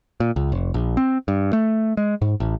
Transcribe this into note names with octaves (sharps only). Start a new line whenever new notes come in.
A#2
C#2
F1
A#1
C4
G2
A3
G#3
G#2
A1